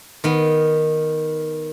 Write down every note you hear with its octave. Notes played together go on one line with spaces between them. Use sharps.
D#3 B3